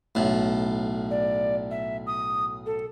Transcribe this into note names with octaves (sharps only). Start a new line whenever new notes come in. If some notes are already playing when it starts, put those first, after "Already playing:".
B1 A2
D5
E5
D#6
A4